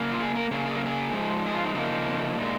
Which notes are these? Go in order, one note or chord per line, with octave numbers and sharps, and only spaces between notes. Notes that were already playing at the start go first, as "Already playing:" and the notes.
Already playing: C#3 A#3
F4
G#4
A#4
C#3 A#3 G#4
G#4
A#4
G#4
G#2 F3 G#3
G#4
F4
D#4
C#3 F3 A#3 D#4
A#2
G#3